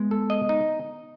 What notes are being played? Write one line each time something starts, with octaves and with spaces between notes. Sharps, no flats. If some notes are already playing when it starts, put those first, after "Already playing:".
Already playing: G#3 B3
A4
D#5
D#4